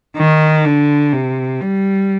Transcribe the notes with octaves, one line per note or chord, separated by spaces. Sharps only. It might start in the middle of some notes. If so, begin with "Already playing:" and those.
D#3
D3
C3
G3